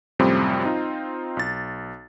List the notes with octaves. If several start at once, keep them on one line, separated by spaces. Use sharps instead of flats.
F#2 A2 C3 F3 G3 C4
C4 D#4 F4
B1 A6